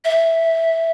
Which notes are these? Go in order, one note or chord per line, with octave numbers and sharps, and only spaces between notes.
E5